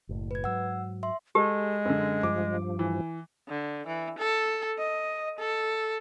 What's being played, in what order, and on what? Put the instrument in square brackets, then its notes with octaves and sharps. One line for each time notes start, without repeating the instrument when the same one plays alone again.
[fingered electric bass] F#1 A2
[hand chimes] B4 G#6
[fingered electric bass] G#2 F#3 [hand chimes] F#5 E6
[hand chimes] E5 C6
[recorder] G#3 [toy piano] G4 [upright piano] A4
[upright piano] F#2 D3
[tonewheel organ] G2 F3 [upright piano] D6
[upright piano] E3
[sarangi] D3
E3
A4
D#5
A4